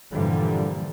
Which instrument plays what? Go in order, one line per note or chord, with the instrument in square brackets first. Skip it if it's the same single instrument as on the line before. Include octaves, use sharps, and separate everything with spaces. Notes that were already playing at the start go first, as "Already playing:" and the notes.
[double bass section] G2 A#2 D3 E3 F3 G3